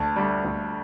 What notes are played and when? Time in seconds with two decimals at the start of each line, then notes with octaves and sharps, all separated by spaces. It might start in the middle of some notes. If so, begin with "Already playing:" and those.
Already playing: D2 A5
0.16 D3 G3
0.44 D2